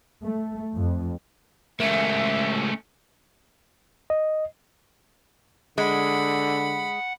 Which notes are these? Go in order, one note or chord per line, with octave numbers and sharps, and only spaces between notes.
A3
F2
C#3 G#3 A3 C#4 A#4 E5
D#5
D3 G#3 F#5 B5